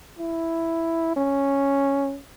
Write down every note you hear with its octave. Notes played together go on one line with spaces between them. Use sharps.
E4
C#4